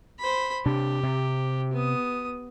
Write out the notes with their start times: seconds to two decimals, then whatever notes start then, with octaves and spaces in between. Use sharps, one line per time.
0.19 C5 B5
0.66 C3 D4 G4
1.03 C3
1.73 B3 D#6